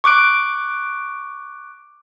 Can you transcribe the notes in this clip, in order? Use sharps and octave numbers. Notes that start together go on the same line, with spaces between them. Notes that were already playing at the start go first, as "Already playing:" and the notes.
C#6 D6 F#6 D7